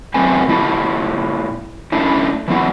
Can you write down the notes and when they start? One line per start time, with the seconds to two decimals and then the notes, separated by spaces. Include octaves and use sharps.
0.14 F#2 A3 C4 B4 C5 G#5
0.47 A#2 F3 E4 D5 A5
1.92 A3 C#4 D4 E4
2.48 E3 F#3 B3 E4